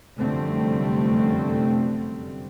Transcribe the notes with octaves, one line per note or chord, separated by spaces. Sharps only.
F1 F#2 D3 G3 A3 C4